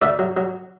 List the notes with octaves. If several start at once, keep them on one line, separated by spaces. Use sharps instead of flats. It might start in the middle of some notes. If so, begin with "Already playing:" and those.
D2 D5 E5
F#3
F#3